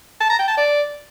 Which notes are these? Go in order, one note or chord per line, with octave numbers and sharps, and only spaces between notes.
A5
A#5
G5
A5
D5